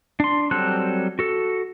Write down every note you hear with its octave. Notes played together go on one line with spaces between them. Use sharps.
D4 C6
F#3 G3 C4 A4 F#6
F#4 A4